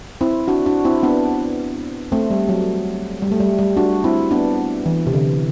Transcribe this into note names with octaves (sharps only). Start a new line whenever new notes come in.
C4 E4
D4 F#4
D4 F#4
C4 E4
B3 D4
A3 C4
G3
F#3
G3
A3
G3
G3
D4 F#4
C4 E4
B3 D4
E3
C3
D3